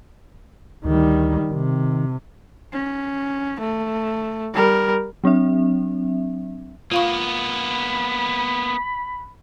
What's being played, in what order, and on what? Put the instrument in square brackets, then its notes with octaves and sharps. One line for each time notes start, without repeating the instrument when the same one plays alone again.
[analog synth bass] D2 [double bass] D#3 G3
[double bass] C3 [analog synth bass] D#3
[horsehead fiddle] C#4
A3
G3 A#4
[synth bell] F#3 C4 D4 E5
[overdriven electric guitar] A#3 B3 [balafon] F4 F5 C#6 [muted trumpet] B5